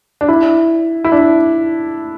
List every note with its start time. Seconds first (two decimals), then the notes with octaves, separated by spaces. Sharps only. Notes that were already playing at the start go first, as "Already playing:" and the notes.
0.21 D4
0.28 E4
1.04 E4
1.12 D4